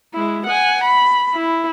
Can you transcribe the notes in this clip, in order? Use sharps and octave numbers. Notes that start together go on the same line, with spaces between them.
G#3 E4
F#5 G#5
B5
E4